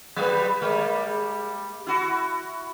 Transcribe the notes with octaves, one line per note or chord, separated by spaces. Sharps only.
F#3 G3 B4
G3 G#3 A#3
E4 F#4